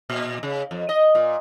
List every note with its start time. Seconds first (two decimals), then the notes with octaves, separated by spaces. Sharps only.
0.10 A#2
0.43 C#3
0.71 F2
0.89 D#5
1.15 A#2